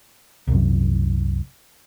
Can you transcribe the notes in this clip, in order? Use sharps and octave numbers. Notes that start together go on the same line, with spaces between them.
C2 F#2